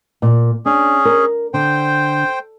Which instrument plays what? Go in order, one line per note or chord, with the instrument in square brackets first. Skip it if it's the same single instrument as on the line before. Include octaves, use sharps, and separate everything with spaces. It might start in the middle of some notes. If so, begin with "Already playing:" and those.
[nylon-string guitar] A#2
[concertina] C#4 G#4 [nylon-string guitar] D4
[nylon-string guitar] A#4
[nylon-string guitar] D3 [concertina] C5 G5